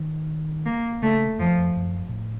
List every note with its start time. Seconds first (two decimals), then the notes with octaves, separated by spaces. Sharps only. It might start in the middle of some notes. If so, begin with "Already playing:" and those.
Already playing: D#3
0.66 A#3
1.02 C#3 A3
1.39 F2 F3
1.58 F2
1.77 F#2
2.09 A#2
2.13 A2